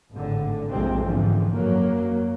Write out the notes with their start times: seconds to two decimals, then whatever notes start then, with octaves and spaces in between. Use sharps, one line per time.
0.13 G#1 A2 D3
0.71 A#1 F2 A2 C3 G#3 C4
1.04 G#1 E2 G#2 D3 E3 F3
1.52 F#2 F#3 A#3